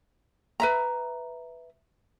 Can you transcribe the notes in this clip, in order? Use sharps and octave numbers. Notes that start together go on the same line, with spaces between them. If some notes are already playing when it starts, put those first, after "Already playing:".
B4 E5 A#5